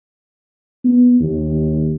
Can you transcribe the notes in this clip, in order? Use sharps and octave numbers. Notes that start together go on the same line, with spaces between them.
B3
D#2